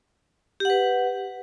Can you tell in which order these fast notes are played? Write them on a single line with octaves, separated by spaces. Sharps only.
G4 F#5 B4